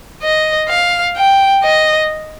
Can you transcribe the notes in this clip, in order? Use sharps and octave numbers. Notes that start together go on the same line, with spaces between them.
D#5
F5
G5
D#5